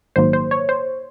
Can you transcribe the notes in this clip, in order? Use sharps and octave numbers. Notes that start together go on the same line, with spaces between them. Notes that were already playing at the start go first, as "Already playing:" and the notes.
A#1 G#2 D#3 F#3 A#3 C5
C5
C#5
C5